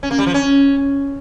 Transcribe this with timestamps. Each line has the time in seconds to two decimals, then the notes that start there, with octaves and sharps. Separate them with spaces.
0.03 C#4
0.11 A#3
0.19 G3
0.26 F3
0.34 C#4